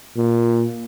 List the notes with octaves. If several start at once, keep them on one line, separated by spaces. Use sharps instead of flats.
A#2